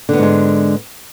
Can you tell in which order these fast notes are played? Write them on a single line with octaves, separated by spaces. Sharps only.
D3 B3 G#2 G#3